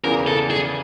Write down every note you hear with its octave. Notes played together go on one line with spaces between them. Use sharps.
E2 C#3 E3 A#4
A4
G#4